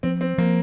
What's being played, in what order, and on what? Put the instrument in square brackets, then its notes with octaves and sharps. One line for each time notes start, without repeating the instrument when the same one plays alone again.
[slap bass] F3 [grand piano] C4
[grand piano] C4
[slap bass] F3 [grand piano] A#3